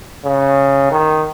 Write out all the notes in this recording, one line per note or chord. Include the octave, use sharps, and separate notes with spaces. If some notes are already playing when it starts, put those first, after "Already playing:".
C#3
D#3